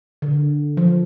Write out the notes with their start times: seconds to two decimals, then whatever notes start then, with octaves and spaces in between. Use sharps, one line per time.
0.22 D3
0.77 F3